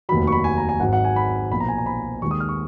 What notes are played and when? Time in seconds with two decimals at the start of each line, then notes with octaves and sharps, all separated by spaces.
0.09 F1 D#2 D#3 F#3 B5
0.27 C#6
0.32 B5
0.44 G#5
0.57 A#5
0.69 G#5
0.80 G#1 G#2 F#3 F#5
0.93 F#5
1.04 G#5
1.16 B5
1.51 B1 A#2 F3 B5
1.60 A#5
1.68 G#5
1.78 A#5
1.86 B5
2.22 D#2 D#3 G#3 C#6
2.31 D#6
2.40 F6
2.49 C#6